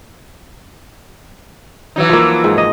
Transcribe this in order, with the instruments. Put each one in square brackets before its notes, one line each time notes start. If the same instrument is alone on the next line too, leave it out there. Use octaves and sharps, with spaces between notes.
[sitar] E3 F#3 D#4
[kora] F3 A#3
G#2
D#5